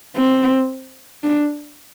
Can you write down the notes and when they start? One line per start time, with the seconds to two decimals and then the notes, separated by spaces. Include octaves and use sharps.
0.16 C4
1.23 D4